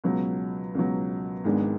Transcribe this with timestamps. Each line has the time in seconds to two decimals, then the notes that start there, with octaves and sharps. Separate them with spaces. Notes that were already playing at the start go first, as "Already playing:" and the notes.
0.04 C#2 B2 F#3
0.75 C#2 B2 F#3
1.44 G#1 G#2 G#3 B3 D4